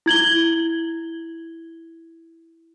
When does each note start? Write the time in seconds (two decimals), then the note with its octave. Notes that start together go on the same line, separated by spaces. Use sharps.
0.06 E4 G#6 F#7 G7